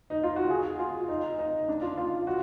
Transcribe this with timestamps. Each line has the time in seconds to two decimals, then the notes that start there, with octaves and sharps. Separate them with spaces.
0.10 D#4
0.23 F4
0.36 F#4
0.50 G#4
0.79 F4
1.08 D#4
1.39 D#4
1.68 D4
1.82 F4
1.97 F4
2.27 F#4